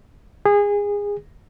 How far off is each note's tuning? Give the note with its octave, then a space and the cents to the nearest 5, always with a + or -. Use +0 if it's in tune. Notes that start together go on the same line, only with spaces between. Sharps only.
G#4 -25